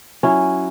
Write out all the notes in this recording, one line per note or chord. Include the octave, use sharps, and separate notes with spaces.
F#3 C#4 E4